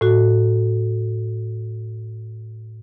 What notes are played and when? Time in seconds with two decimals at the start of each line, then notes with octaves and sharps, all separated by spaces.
0.01 A2 F#4